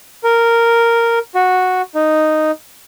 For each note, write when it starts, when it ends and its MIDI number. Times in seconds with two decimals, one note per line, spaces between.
0.24 1.19 70
1.35 1.82 66
1.95 2.51 63